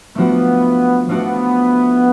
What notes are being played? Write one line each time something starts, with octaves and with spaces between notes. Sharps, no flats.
F3 A3 B3 D4 F#4
F3 A3 B3 D4 F#4